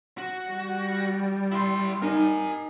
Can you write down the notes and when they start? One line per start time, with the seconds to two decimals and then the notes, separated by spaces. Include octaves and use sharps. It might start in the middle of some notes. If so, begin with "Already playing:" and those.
0.18 F#4
0.48 G3
1.52 E4 C6
2.02 D#4 A#4 G#5